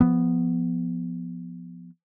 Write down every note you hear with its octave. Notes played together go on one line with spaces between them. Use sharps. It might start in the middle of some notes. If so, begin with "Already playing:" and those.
F3 B3